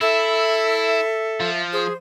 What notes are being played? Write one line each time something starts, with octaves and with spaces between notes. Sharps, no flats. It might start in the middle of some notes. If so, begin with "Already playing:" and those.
E4 A4 E5
F3
G#4 C5